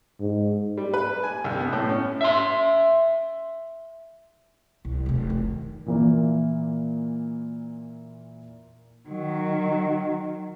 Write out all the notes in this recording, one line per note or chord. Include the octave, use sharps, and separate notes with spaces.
G#2
G3
B4
G#5
C2
B3
A2
C#4
E5 C6
C2
F1 C3
D#3
A#2 E3 A#3
D#3 F#3